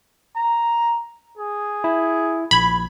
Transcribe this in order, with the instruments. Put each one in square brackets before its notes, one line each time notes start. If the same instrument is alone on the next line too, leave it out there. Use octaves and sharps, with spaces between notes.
[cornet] A#5
G#4
[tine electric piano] E4
[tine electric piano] A#1 G#6 [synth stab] B5